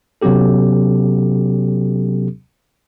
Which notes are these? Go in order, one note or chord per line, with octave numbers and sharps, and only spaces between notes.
C3 F#3 B3 C#4 G4 A4